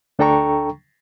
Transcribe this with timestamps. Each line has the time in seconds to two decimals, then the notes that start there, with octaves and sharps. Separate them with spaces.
0.19 D2 D4 A4 G5 A#5 C#6